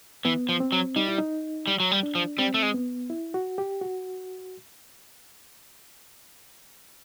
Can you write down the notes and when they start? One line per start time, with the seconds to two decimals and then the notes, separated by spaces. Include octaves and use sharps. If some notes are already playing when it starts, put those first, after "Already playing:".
0.25 E3 B3
0.49 F3
0.60 C4
0.72 F#3
0.96 G3 D#4
1.08 E4
1.19 D#4
1.67 G3
1.80 F#3
1.91 G3
2.03 D4
2.15 F3
2.38 G3 C4
2.54 A3
2.62 G#3
2.74 B3
3.10 E4
3.34 F#4
3.58 G4
3.81 F#4